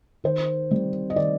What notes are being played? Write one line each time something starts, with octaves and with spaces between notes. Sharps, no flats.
D#3 C5
G3 C4
D#5
D#3 D5